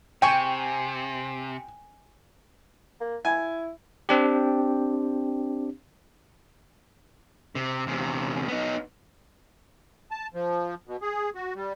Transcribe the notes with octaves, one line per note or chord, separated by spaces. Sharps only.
C3 G5 G#5 C#6
A#3
E4 G#5
C4 D4 G4
C3
E2 C3
B3 D#4
A5
F3
B2
G#4
F#4
G3